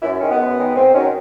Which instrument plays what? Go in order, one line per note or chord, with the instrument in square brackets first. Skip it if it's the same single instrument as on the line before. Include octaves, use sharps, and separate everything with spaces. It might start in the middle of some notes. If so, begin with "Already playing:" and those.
[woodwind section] F#2 E4
D#3 G#3 C#4
B3
F#2
D#3 G#3
G#2 C4
D#3 F#3 C#4